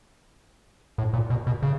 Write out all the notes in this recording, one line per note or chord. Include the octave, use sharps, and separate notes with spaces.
A2
A#2
B2
B2
C#3